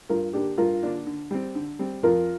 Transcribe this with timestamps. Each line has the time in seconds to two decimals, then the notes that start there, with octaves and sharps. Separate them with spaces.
0.09 G2 F4 A#4
0.33 D3 A#3 D4 G4
0.58 G2 F4 A#4
0.83 D3 A#3 D4
1.07 D3
1.31 G3 C4
1.55 D3
1.79 G3 C4
2.03 F2 F4 A#4